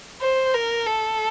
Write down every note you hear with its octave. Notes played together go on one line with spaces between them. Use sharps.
C5
A#4
A4